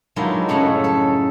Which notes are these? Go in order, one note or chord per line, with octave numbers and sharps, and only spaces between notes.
G2 D#3 F#3 G#3 E4 F4
F#2 A2 C#3 A4 C#5 F#5
A4